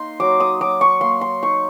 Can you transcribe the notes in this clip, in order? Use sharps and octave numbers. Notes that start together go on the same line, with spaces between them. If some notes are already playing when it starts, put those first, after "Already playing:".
Already playing: A#3 D#4 C6
F#3 D6
D#6
F#3 D6
C#6
A#3 C6
C6
D#4 C#6